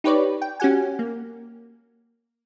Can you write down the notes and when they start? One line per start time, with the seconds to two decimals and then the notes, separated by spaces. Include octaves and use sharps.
0.04 D#4 G4 B4 C#5 D5
0.42 G5
0.60 C#4 F#4 G4 F#5 G#5
0.99 A#3